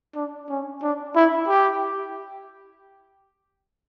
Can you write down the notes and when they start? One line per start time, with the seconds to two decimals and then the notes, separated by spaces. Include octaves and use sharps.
0.15 D4
0.49 C#4
0.82 D4
1.15 E4
1.48 G4